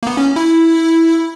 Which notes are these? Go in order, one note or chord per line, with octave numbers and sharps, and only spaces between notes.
A#3
B3
C#4
E4